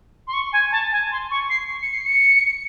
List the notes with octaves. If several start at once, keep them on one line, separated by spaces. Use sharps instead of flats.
C6
C#6
G#5
A5
G#5
C6
C#6
C7
C#7
C7
C#7